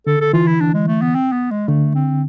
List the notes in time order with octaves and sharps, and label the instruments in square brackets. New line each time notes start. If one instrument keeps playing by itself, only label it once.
[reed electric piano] D3 [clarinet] A4
[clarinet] A4
[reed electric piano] E3 [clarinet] F4
[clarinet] E4
D4
G#3
A3
B3
C4
B3
G#3
[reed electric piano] D3 [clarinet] A3
[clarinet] C4